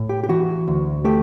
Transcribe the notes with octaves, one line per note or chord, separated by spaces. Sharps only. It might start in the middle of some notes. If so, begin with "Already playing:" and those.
Already playing: A2
G4
G4
E3 F#4
D2
A3 G4